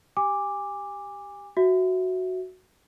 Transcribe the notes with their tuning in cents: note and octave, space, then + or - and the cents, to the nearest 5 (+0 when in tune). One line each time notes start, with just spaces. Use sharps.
G4 +0 G#5 -30 D6 +0
F#4 +0 E5 +0